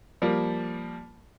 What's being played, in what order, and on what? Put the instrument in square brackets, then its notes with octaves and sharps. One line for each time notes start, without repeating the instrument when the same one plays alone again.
[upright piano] F3 G3 A#3